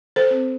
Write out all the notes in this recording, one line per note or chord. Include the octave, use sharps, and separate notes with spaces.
A4 C5
C4